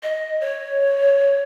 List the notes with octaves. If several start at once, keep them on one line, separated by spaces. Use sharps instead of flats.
D#5
C#5